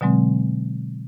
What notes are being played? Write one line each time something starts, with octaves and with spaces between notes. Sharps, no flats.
B2 D3 F#3 G#3 C4